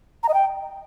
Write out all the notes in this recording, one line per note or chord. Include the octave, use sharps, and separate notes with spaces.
A#5
D#5
G5